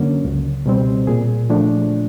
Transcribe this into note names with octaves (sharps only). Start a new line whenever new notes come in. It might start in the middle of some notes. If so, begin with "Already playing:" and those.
Already playing: F#2 D3 F#3 A#3 C#4
C#2
B2 G3 C4
A#2 G#4
F3 A3 D4